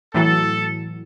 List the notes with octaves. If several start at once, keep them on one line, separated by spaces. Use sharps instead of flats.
A2 E3 F#3 A4